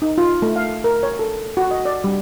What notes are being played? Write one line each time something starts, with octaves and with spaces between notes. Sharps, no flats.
D#4
F4
A3
F5
A#4
C#5
A4
F#4
D#5
D5
G3